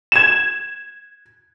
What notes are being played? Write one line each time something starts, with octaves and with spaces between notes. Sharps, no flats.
G#6 E7